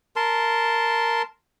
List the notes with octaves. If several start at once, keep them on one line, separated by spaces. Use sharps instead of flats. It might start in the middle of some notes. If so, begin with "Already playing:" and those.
A#4 A5 C6